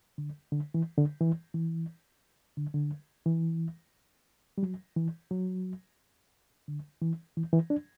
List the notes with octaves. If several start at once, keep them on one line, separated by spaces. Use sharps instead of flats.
D3
D3
E3
D3
E3
E3
D3
D3
E3
G3
F#3
E3
F#3
D3
E3
E3
E3
D4